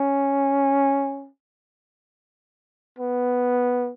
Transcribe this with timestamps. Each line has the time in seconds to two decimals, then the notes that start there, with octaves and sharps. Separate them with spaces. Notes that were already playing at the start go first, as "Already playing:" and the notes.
Already playing: C#4
2.99 B3